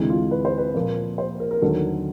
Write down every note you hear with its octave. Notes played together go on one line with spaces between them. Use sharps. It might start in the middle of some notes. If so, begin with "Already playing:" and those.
Already playing: D2 C3 E3 G#3
F4
B4
C5
B4
A#2 F3 A#3
C5
A#4
A#4
D#2 D3 F#3 A3 A4